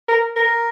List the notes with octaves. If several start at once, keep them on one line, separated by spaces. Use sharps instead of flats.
A#4
A#4